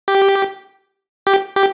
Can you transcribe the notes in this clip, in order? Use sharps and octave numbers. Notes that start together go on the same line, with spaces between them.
G4
G4
G4